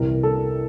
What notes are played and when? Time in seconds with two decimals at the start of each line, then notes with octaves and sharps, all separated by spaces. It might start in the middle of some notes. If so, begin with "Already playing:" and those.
Already playing: C2 C3 E3 A#4
0.23 A4